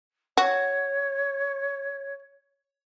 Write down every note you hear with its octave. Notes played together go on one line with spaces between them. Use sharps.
F#4 C#5